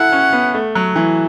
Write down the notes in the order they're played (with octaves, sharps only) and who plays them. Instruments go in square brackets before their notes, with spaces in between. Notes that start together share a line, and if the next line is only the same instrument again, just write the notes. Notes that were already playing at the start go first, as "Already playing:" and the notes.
Already playing: [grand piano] E4 A4 [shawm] F#5
[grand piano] C#4
B3
A3
F#3
E3